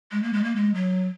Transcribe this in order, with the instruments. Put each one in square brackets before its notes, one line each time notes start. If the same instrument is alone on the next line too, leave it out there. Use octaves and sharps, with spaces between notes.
[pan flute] G#3
A#3
G#3
A#3
G#3
F#3